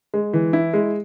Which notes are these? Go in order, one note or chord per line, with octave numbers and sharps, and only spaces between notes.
G#3
E3
E4
G#3